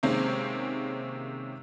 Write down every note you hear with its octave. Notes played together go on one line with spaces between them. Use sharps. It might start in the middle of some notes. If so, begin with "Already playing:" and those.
C3 D#3 G#3 A#3 C4 C#4